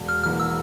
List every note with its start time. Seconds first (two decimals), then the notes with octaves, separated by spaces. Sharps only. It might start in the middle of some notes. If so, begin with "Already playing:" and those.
Already playing: E1
0.09 F6
0.23 E2 E3 A#3 F6
0.40 E6